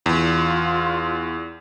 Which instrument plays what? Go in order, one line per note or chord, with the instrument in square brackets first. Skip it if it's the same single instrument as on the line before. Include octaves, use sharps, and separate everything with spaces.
[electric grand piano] E2 [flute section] F4